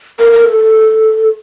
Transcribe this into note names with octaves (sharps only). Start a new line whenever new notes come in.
A#4
A#4
A4